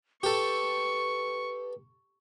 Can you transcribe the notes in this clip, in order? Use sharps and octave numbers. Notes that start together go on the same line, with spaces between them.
G4 A4 B4 C#6